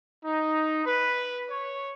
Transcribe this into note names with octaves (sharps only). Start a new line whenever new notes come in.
D#4
B4
C#5